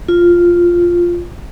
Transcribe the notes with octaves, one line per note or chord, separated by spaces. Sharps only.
F4